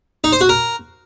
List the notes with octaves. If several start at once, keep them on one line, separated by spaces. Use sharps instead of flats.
D#4
C5
F#4
A#4